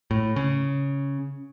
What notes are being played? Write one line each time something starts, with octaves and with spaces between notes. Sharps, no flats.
A2
C#3